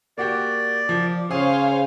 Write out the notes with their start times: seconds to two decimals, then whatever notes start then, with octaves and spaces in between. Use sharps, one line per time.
0.18 A#3 F#4 G4 D5
0.89 F3
1.31 C#3 G#4 C5 C#5 F5 G#5